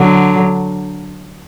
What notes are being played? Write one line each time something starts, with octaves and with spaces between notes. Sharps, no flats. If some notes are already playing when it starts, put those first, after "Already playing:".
Already playing: D3 F#3